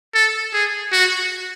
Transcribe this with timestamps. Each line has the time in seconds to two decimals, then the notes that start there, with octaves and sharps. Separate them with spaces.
0.14 A4
0.53 G#4
0.92 F#4